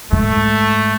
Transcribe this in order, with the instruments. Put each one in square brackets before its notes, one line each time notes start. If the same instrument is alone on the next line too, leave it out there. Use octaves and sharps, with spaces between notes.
[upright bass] G#2 [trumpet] A3